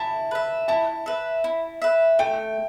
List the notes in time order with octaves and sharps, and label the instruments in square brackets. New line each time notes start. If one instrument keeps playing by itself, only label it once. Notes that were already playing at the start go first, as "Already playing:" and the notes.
Already playing: [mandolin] E4 [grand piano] A5
[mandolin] B4 E5
[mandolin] E4 [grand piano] A5
[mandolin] B4 E5
E4
B4 E5
[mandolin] A3 [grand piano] G5